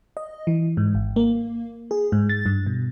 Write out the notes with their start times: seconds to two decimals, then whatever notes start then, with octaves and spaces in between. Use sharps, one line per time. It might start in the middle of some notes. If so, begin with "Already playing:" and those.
0.17 D#5
0.47 E3
0.77 G#2
0.95 G#1
1.16 A#3
1.91 G#4
2.12 G#2
2.29 A6
2.46 G2
2.66 B2